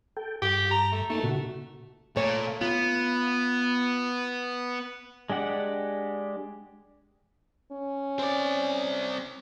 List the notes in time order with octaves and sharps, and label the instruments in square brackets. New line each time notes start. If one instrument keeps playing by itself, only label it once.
[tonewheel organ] A4 G5
[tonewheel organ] G2 [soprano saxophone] G4
[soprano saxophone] A#5
A3
[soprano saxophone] A3 [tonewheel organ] A#3 D#4
[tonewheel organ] A#2 C#3 F#4
[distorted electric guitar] A#2 [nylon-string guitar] A3 C#5
[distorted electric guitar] B3 [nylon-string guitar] F4
[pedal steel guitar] G#3 D4 G4 F#5
[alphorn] C#4
[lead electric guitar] C4 D5